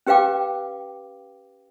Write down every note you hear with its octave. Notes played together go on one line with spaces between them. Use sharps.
C#4 G4 B4 F5 G5 D6